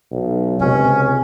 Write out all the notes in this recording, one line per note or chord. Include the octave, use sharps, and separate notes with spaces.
B1
C#2 C3 C#4